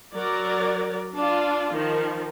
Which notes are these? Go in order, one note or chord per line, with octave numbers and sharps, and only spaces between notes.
F#3 A#4 D5
D4 F4
D#3 F3